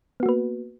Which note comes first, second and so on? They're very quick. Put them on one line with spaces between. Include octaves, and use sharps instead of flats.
B3 F#4 A#3 B4